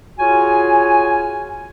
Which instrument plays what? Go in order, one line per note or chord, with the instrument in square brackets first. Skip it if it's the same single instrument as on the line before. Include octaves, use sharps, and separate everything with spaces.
[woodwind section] F4 F#4 G#4 C#5 G#5